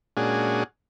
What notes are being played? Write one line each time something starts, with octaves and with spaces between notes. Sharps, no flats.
A#2 G#3 C#4 D4 F#4 G#4